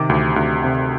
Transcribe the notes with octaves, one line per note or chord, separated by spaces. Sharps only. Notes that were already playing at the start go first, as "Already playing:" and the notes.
Already playing: C3 D#3 D6
D2
D2
C3